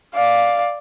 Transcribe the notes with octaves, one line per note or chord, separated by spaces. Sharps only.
D5 F5